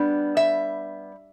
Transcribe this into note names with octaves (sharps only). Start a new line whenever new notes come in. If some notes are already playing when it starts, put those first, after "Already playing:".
Already playing: G3 B3 D4
E5